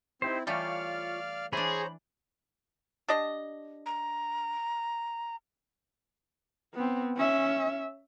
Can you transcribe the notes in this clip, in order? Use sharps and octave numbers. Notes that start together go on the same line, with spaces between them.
C4 D#4 E4 G4 C5
E3 G3 A3 F4 C#5 D5 F5 F6
E3 D4 G#4 C5 C#5 A#5 B5
D4 G4 D#5
A#5
B3 C4
C#4 E5